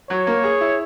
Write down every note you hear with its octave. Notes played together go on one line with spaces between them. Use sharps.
F#3 C#5
A#3
G#4
E4